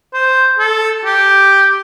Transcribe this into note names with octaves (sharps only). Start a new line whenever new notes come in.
C5
A4
G4